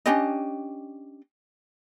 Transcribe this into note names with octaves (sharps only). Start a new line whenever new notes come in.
C#4 D4 G4 D#5